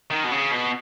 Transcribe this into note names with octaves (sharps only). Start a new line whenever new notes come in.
D#3
B2
C#3
B2